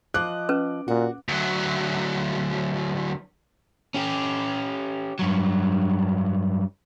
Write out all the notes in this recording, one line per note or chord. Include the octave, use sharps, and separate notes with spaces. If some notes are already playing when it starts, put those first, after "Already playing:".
F3 D#5 D6 F#6
C#4 B4
A#2 F#4
D2 F#3
C#4 G4
G2 F#3